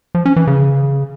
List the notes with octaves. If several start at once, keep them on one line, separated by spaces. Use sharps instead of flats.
F3
C#4
E3
C#3